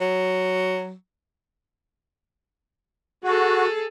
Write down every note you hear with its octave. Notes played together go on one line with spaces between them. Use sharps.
F#3
F#4 G#4 A4